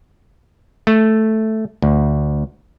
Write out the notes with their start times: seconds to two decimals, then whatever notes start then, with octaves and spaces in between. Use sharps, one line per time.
0.87 A3
1.82 D2